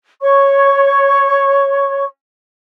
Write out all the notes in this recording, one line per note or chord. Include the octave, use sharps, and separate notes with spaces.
C#5 C#6